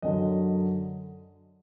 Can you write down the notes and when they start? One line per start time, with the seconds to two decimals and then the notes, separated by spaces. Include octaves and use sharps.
0.02 F#2 D3 F#3 D#5